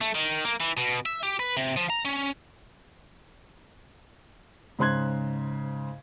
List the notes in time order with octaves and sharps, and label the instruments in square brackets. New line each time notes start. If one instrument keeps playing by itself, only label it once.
[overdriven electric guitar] A3
D#3
A#3
E3
B2
E5
G4
B4
C3
F3
A#5
C#4
[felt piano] G#2 C#3 C5 C6 F#6 G#6